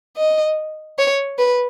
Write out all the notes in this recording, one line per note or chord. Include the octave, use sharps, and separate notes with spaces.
D#5
C#5
B4